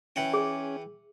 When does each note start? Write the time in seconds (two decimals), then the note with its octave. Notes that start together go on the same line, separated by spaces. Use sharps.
0.16 E3 C#4 F#5 G5
0.34 G#4